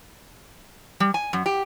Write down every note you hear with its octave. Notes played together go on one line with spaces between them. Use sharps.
G3
G#5
F#2
G4